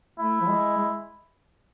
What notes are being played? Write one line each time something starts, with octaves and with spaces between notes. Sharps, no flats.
A3 E4
F3
G#3
G#3